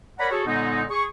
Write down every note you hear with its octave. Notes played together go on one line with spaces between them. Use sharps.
A#4 C#5 D5 F#5 A#5 B5
F#4 G#4 A4 C#5
A#2 D3 G#3 B3 C#4 D#4
G#4 C#6